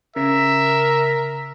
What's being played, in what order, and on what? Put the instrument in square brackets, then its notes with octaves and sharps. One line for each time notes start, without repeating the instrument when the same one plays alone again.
[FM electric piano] C#3 [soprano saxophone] A#4 [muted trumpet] E5